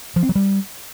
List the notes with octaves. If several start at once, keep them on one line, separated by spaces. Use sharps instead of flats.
F3
C4
F#3
G3